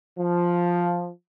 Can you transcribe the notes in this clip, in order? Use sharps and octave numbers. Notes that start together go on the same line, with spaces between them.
F3